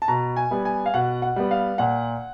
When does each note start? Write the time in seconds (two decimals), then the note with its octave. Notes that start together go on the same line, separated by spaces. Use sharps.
0.02 A5
0.08 B2 A#5
0.37 G#5
0.51 G3 B3
0.65 G#5
0.86 F5
0.94 B2 F#5
1.22 F#5
1.36 G3 B3
1.51 F5
1.78 A#2 F#5